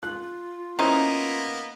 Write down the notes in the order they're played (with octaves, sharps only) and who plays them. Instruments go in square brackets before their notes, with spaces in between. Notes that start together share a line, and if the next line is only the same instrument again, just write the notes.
[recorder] F4 [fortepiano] F#6
[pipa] C#3 D#4 [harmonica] A#3 B3 [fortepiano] C#4 E4 C5